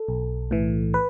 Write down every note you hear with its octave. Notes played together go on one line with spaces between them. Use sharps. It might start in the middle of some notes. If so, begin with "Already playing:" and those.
Already playing: A4
B1
A2 E3
B4